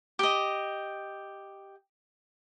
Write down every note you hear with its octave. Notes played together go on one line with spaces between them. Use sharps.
G4 D#5